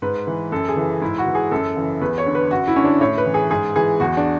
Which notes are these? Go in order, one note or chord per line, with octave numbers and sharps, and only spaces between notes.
G#2 B4
E3
F#2 A4
G#4
C#3 E3
G#2 E4
F#4
E3
G#4
F#2 A4
C#3 E3
E2 B4
C#5
D3
B4
F#2 F#4
E4
D3 C#4
D4
A2 C#5
B4
E3
G#4
G#2 G#4
E3 G#4
E2 F#4
D4